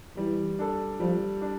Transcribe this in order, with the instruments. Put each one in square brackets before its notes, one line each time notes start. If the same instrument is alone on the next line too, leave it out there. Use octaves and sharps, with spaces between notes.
[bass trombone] E3 [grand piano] G3
[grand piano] D4 A4
[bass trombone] F3 [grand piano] G3
[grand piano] D4